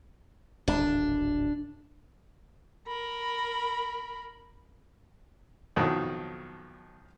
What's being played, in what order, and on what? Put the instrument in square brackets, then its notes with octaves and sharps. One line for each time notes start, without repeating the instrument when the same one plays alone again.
[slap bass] D1 G#1 [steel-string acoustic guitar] D4
[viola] A#4 B5
[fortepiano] B1 F2 A2 D#3 F#3